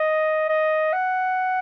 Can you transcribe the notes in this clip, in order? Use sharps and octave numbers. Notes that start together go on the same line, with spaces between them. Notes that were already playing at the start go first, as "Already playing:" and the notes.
Already playing: D#5
D#5
F#5